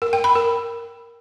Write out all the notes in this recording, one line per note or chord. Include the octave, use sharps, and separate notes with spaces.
A#4
G5
B5
A#4